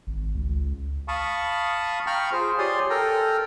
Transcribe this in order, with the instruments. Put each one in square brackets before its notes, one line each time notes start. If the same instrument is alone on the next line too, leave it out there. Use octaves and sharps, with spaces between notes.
[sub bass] G#1
C#2
[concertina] F5 A5 B5 C#6 D#6
F5 G5 A#5 B5 C#6 F6
F4 G#4 C5
G4 C#5 D5 G#5 C6 D#6
A4 A#4 G5 A#5